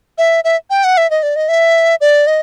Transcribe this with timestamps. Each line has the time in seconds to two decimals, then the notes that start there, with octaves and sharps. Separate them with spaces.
0.18 E5
0.44 E5
0.70 G5
0.84 F#5
0.97 E5
1.10 D#5
1.23 D5
1.36 D#5
1.49 E5
2.01 D5
2.27 D#5